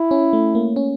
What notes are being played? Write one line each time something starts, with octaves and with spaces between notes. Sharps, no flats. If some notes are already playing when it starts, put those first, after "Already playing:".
Already playing: E4
C#4
A3
A#3
C#4